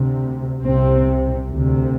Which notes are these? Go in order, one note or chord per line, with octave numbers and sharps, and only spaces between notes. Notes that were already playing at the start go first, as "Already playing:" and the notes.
Already playing: D2 C3
C2 C3 C4
D2 C3